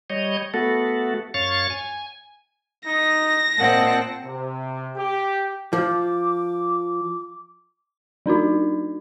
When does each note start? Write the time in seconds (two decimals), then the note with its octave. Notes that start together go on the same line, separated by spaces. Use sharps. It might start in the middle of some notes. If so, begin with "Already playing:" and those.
0.10 G3 C#5 D#5
0.54 A3 B3 F#4 A4
1.34 F#2 C#5 F5 C#6 A6
1.70 G#5
2.86 D#4 A#6
3.58 A#2 C4 D#5 F#5 A5
4.25 C3
4.96 G4
5.73 F3 D6
8.26 F#3 D4 D#4 F#4